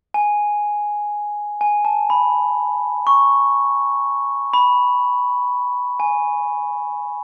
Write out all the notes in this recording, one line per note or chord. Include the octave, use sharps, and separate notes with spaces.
G#5
G#5
A5
B5
C#6
B5
G#5